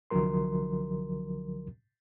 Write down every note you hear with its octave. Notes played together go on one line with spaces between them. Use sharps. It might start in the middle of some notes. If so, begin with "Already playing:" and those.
C2 D3 F3 F#3 A#4 C6